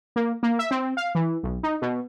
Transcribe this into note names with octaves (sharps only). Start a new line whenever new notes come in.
A#3
A#3
E5
C4
F5
E3
B1
D#4
B2